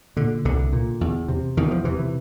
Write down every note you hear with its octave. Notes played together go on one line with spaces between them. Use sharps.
A#2 D3
C2 D3
A#2
E2
C3
E2 D#3
F3
C3 E3
E3